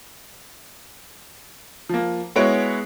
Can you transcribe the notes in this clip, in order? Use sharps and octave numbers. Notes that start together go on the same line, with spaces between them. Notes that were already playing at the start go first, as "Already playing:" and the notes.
F3 A#3
G#3 B3 E4 F#4 C#5 D7